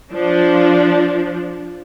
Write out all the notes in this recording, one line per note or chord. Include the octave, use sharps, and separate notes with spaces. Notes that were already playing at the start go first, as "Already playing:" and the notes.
F3 D4